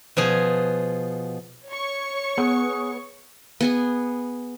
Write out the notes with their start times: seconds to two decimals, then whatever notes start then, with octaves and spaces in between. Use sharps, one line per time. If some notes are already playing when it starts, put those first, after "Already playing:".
0.17 B2 F3 G#4
1.66 C#5 C#6
2.38 B3 G#4 F#5
3.61 B3 G#4 G#5